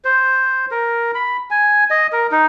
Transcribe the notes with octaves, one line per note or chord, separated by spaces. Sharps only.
C5
A#4
B5
G#5
D#5
A#4
D#4